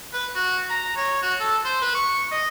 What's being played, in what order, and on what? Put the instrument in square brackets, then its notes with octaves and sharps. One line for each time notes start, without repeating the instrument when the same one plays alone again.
[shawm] B4
F#4
A#5
C#5
F#4
A4
C5
B4
C#6
D#5